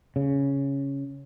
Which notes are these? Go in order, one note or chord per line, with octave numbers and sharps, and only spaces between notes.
C#3